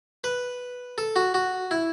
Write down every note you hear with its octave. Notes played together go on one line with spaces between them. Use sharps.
B4
A4
F#4
F#4
E4